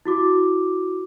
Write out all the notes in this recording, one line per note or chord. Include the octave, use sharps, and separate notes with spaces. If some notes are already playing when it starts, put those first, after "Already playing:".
E4 F#4 D6